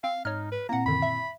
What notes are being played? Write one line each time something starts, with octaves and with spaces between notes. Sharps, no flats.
C4 F5
G#2 D#4 C#5 F6
B4
A#2 A#3 C4 E4 F#5 A#5
F#2 D3 D#3 B5
E5